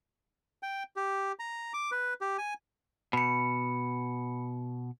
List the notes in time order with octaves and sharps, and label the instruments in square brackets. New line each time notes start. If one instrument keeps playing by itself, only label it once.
[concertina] G5
G4
A#5
D6
B4
G4
G#5
[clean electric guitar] B2 [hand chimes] B5 C#7